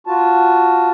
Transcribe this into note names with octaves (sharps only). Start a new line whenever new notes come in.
F4 F#4 A5